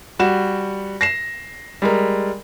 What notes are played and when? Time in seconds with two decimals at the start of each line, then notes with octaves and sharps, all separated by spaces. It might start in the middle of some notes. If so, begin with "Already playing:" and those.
0.19 G3 F#4 E7
1.01 A#6 C7 E7
1.82 G3 G#3 A#4